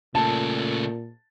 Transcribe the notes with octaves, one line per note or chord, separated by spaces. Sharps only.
A#2 C#3 A3 A5